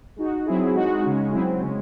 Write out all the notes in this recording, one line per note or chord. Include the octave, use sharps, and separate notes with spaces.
G#3 D#4 F#4
F#3 C4 E4 G#4
G#3 D#4 F#4
C#3 G#3 C#4
F#3 C4 E4 G#4
C#3 G#3 C#4